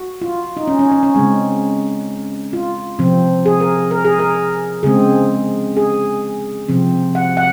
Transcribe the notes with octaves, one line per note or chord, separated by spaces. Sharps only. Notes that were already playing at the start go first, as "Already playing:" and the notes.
Already playing: F#4
F4
D#4
C#4
C#4
C#4
C#4
C#3 G#3 C4
F4
C3 F3 C4
G#4
A#4
A#4
G#4
A#4
C#3 G#3 C4 G#4
G#4
C3 F3 C4
F#5
F#5